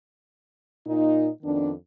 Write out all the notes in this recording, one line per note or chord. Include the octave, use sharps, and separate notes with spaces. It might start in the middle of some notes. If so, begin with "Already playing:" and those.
A#2 D#4
F2 D#3 B3 D4